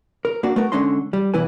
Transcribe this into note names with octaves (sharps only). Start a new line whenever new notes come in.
A#4
A#3 D4 F#4
A3 B3 A#4
D3 G#3 C#4 D4 D#5 C6
G3
B1 B2 E3 E4 B4 G#5